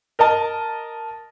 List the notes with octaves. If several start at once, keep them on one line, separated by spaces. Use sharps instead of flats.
A#4 D#5 A5